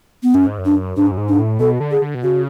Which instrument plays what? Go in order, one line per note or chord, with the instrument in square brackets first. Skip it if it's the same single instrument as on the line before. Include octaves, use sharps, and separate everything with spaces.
[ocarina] B3
[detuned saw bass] F#2 [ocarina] C#4
[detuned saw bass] G#2
F#2
[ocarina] D4
[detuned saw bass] G#2 [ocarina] D4
[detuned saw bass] F#2
G#2
[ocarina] D4
[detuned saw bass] A2
[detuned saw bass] B2 [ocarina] A4
[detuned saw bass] D3
[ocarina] G#4
[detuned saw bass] D3
B2
[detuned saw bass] C#3 [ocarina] F#4